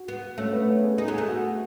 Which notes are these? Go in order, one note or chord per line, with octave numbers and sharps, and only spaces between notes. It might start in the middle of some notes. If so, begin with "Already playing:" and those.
Already playing: F#4
B3
A3 C#4
B3
C#4
G#4
D#4 G#4
B3
A3 G#4
F#4